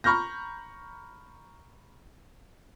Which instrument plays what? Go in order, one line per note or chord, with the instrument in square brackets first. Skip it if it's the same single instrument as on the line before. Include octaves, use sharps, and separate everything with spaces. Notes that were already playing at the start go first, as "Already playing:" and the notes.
[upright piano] A#5 B5 C#6 F6 G6 A#6